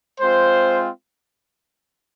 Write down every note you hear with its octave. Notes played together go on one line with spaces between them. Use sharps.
G#3 C4 F4 C5